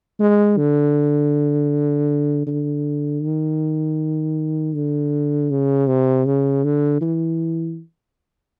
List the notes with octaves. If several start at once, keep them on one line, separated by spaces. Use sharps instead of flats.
G#3
D3
D3
D#3
D3
C#3
C3
C#3
D3
E3